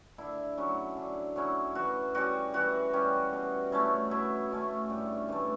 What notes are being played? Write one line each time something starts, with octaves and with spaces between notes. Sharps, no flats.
D3 E4
F#3 C#4 E4
D3
F#3 C#4 E4
E3 F#4
G3 C#4 F#4
E3 F#4
G3 C#4
B2
A3 C#4 E4
B2 E4
A3 C#4 E4
G2
E3 A3